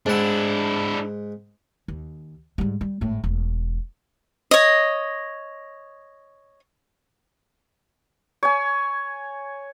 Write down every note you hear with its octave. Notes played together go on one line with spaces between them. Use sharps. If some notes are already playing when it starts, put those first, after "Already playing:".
G#2 D4 E4 F#5
D#2
G#2 G3
G3
G#1 A2
E1
C#5 D#5
C#5 G#5